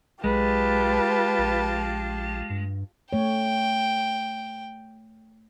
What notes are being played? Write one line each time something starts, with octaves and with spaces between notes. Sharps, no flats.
B1 G#3 F4 G4 B4 A5
A#1
G2
A3 C#5 G5